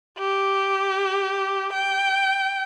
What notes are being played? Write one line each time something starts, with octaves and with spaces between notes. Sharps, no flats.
G4
G5